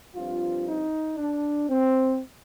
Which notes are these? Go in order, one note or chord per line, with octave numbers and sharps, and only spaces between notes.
G2 F3 C4 F4
D#4
D4
C4